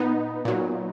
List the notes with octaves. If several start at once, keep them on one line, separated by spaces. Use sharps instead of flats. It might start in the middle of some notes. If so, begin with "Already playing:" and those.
Already playing: A#2 B3 D#4
A#2 F#3